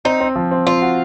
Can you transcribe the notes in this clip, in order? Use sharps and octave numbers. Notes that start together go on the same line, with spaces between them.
C4 D#4
C4
F3
C4
C4 F4
F#4